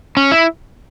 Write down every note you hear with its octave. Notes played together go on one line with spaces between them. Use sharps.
C#4
E4